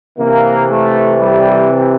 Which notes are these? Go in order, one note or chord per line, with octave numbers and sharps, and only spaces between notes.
C3 E3 A#3
A3
G3